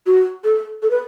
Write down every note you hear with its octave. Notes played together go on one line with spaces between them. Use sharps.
F#4
A4
A4
B4